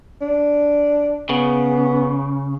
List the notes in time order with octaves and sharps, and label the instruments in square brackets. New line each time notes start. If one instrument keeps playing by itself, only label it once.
[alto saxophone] D4
[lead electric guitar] C#3 [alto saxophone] B3